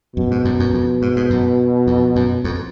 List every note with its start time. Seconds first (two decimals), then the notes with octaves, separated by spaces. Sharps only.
0.16 F#2 B2
0.31 G#2
0.45 F#2
0.60 F#2
0.74 F2
1.02 G#2
1.16 G#2
1.30 F#2
1.87 F2
2.16 F#2
2.44 F2